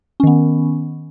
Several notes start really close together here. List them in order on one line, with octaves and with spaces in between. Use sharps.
C#4 D#3 B3